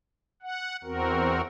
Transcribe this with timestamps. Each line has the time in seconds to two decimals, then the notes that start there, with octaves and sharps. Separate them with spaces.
0.42 F#5
0.84 E2 C4 F#4 A#4